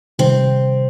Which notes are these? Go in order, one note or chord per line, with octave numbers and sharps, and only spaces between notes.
C3 D#3 G3 C4